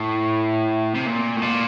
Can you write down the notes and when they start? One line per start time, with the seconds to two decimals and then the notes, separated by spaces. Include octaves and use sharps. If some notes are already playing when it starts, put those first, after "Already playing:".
Already playing: A2
0.95 C3
1.07 A#2
1.36 A2
1.42 A#2